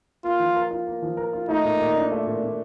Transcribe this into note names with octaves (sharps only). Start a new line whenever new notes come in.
A#3 F4
F3
A#4
F4
A#3
F3
A#4
F4
A3 D#4
A#2
A#2
D4
A3
A#2
A#2